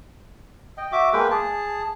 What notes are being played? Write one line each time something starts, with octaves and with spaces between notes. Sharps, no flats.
D#5 G5
F#4 E5 D6
G#3 A#3 B4 G5
G#4 A5